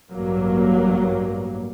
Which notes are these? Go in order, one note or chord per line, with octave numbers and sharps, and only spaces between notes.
A1 G2 F#3 A#3